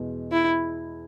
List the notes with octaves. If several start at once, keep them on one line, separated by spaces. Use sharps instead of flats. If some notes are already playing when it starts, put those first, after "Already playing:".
Already playing: E2 B2 G#3
E4